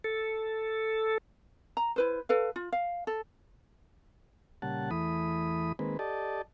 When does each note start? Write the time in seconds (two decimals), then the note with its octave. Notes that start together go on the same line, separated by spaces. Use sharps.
0.04 A4
1.77 A#5
1.96 E4 B4 C5
2.29 A4 B4 F5
2.56 F4
2.72 F5
3.07 A4
4.62 A#2 C#3 G3 F#5 A5
4.91 E2 E3 A3 B5 D#6
5.79 D#3 G#3 A#3 C4 B4
5.99 G4 A4 D5 D#5 A5